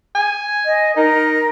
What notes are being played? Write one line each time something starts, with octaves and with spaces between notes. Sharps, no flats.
G#5
D#5
D#4 A#4